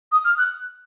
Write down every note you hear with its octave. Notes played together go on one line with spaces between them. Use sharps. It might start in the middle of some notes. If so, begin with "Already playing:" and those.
D#6
F6
F#6